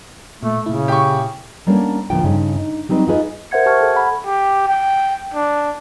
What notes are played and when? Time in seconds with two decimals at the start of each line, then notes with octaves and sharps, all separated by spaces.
0.43 A#2 A3
0.66 A#2 C#3 E4
0.88 G4 C#6
1.67 G3 A#3 B3 C#4 D4 A4
2.10 E2 A#2 D3 F3 G5
2.24 G2 C#3 C#4 D#4
2.56 D#4
2.89 F#3 G3 C4 D#4 B4
3.08 D#4 F4 G#4 B4 C5 D#5
3.51 A#4 C5 E5 F#5 G#6 C#7
3.66 G4 A5 C#6 F6 G#6
3.81 A4
3.95 F#5 B5
4.26 G4
4.68 G5
5.34 D4